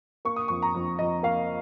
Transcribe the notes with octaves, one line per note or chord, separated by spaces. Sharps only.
A#3 C#6
D#6
F2 C#6
A#5
F2
F2 D#5
A#3 F5